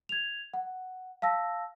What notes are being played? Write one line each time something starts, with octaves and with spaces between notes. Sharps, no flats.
G#6 F7
F#5
F5 A5 E6 A#6